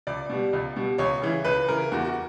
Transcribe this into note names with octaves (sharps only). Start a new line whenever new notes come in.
C#2 D5
B2 G3
C#2
B2 G3
C#2 C#5
C#3 E3
C#2 B4
C#3 E3 A#4
E2 F#4
F#4